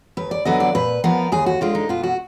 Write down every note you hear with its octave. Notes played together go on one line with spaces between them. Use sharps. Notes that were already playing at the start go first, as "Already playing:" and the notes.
D#2 B4
D5
D3 F#3 B3 D#5
D5
A#2 B4
F3 B3 A#4
D#2 G#4
F#4
D3 G#3 F4
D#4
B2 F4
F#4